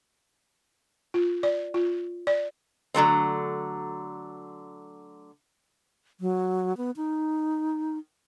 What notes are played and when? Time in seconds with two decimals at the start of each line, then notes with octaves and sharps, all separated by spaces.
1.14 F4
1.43 D5
1.74 F4
2.27 D5
2.94 D3 F#3 A3 C4
6.20 F#3
6.77 B3
6.96 D#4